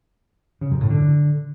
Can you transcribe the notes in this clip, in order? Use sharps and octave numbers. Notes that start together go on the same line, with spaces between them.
C#3
F#2
A2
D3